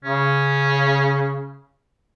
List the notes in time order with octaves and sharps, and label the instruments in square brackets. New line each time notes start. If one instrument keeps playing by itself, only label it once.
[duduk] C#3 [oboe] C#4